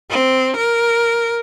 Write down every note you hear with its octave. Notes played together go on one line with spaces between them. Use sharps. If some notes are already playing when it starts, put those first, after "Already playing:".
C4
A#4